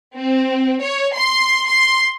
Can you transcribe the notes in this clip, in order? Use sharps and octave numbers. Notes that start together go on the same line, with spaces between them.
C4
C#5
C6
C6